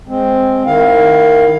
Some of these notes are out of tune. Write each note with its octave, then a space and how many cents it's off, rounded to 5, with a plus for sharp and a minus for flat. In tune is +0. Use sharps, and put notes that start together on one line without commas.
G#3 +0 C4 +0
D#3 -10 E4 +0 F5 +15